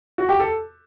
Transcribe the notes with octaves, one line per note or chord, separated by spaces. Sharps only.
F#4
G4
A4